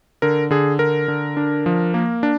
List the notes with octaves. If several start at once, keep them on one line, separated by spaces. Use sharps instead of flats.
D3 A#4
D3 G#4
D3 A#4
D3
D4
F3
A#3
D4